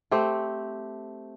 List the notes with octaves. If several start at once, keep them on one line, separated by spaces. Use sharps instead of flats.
A3 C4 G4 C5